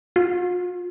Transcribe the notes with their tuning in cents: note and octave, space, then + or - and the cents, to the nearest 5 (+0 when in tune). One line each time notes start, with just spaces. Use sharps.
F4 +40